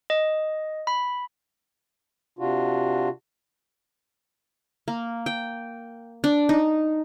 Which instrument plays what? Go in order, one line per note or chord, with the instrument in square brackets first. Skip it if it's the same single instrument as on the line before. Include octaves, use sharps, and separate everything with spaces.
[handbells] D#5
B5
[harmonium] C3 D4 F4 F#4
[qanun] A#3
G5
D4
D#4